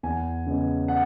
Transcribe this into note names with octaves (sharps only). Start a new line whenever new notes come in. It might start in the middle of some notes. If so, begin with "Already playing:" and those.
E2 G#5
C#3 G#3 B3
F#5